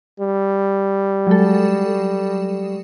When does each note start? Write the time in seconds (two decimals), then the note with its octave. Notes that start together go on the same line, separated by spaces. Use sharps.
0.20 G3
1.27 F#3 G#3 A4